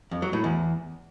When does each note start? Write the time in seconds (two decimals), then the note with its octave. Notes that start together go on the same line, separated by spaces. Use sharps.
0.11 F2
0.22 F#3
0.33 A2
0.44 E2